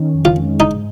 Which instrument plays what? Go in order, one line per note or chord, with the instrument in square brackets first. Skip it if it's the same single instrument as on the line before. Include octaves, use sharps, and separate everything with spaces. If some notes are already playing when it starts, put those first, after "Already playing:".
Already playing: [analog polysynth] D#3 C#4
F2
[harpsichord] F4
[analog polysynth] G#3
[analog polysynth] G#2 [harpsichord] D#4